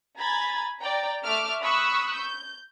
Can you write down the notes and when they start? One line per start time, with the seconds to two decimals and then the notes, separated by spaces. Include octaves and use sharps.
0.18 G#5 A#5 B5 G#6 A6
0.81 D5 G5 A#5
1.24 A3 E5 D6 F6
1.62 B5 C#6 D#6 E6 F#6
2.15 G6